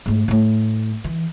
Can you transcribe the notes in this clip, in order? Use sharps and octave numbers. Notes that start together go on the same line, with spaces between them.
G#2 A3
A2 A3
E3